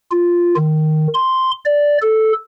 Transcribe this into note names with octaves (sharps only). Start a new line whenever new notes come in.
F4
D#3
C6
D5
A4